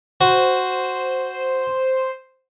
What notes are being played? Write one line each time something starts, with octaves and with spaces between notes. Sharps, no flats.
F#4 C5